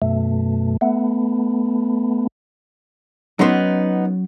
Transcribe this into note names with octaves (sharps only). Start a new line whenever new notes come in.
F#2 B2 A3
A3 B3
F#3 B3 C#4 D#4 C6